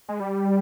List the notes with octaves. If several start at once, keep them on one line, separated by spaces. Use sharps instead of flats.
G#3
G3